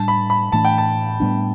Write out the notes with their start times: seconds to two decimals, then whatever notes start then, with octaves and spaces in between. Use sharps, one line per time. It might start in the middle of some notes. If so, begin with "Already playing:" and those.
Already playing: A2 G3 D4 A5
0.08 B5
0.30 B5
0.52 A2 E3 A3 D4 A5
0.65 G5
0.78 A5
1.20 A2 G3 B3 D4